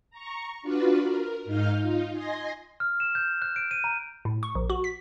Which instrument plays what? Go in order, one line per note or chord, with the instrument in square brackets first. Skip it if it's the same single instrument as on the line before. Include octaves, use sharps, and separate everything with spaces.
[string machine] A#5 C#6
D4 F4 F#4 B4 D5
A#4
G#2 D#4 F5 F6 G6
D#4 F4
D#5 G#5 C6 A#6
[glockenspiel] F6
E7
G6
F#6
D7
D#7
A#5
[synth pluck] A2
C#6
A#1
F#4
B6